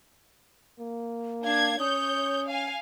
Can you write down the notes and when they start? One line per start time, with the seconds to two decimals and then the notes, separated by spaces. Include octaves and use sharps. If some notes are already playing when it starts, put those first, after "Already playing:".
0.79 A#3
1.44 D4 F5 G#6
1.80 C#4 C#5 D#6 G6
2.48 F5 G#5